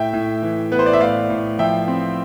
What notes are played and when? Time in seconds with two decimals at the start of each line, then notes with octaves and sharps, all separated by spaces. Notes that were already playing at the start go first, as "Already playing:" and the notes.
Already playing: A2 E5 G5
0.13 A2
0.42 E3
0.72 B3 B4
0.79 C5
0.86 D5
0.93 E5
1.01 A2 D5 F5
1.30 A2
1.59 F3 E5 G5
1.88 C4